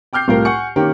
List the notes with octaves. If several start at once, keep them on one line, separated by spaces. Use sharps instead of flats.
G5 D6 F6 G6 C7
C2 A2 F4 G4 A#4
F#5 G#5 C#6 C#7
D#3 A#3 C#4 G4 A#4